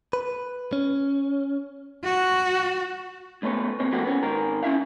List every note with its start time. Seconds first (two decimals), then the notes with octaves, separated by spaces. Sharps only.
0.13 B4
0.73 C#4
2.04 F#4
3.42 C#2 A3 B3 C#5
3.80 B2 A#3 C4 C#5
3.92 F2 B2 A3 A#3 F#4 G4
4.04 B3 C#4
4.23 G#2 D#3 A#4
4.63 C#4 E4 E5 F5